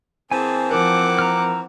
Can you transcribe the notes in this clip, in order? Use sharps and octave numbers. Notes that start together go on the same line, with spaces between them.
E3 A#3 C4 G#4 G#5 A5
F3 A#4 F#5 D6
A#5 F6